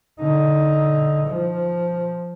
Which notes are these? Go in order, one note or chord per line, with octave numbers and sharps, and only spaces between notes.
D3 D#4
F3